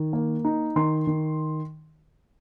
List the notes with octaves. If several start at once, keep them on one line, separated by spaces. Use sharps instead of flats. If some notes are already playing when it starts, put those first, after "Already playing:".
Already playing: D#3
A#3
D#4
D#3 C6
D#3